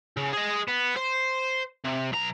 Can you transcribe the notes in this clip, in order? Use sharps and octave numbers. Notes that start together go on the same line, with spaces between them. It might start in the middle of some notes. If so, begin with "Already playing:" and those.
C#3
G#4 D#5
B3
C5
C3
B1 A#5